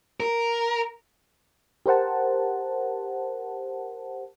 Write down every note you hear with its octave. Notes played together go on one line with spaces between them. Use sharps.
A#4
G4 A#4 C5 F#5 A5